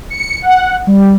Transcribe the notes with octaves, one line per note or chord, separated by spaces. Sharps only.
C#7
F#5
G3